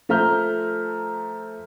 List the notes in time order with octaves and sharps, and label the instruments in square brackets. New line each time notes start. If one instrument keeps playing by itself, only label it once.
[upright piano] F3 A3 E5 A#5 F6 G6